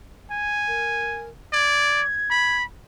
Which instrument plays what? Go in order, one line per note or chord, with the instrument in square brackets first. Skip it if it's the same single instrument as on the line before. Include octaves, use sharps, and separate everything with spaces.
[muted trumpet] G#5
[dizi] A#4
[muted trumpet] D5 [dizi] G#6
[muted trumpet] B5